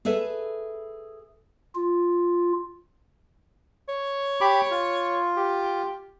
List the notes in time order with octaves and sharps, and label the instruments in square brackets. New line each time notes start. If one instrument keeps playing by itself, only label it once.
[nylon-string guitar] G#4 A4 B4 E5
[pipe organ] F4
[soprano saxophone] C#5
[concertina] G4 B5 D6
F4
[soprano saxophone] G4